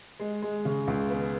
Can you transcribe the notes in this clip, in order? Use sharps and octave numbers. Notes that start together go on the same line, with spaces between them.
G#3
G#3
C#3
C#2
B3